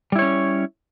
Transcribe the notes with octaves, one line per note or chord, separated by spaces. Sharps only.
G3 C#4 E4 C#5